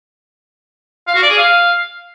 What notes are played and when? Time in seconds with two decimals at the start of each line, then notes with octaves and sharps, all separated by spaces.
1.07 F5
1.15 F#4
1.22 D5
1.30 G#4
1.37 F5